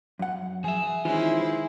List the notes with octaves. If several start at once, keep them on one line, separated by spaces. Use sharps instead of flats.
F#2 F#5
F3 G#4 E5
D#3 E3 G#3 C#4 E4 F4 C5